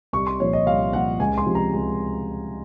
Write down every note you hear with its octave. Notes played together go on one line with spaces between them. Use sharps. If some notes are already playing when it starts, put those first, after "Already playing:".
C2 C#6
C6
A#2 F3 C#5
D#5
C2 F5
A#2 F3 F#5
C#2 G#5
C6
C3 F3
A#5
C#2